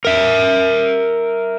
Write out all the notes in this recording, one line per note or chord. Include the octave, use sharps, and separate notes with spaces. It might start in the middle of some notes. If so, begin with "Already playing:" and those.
A#4 E5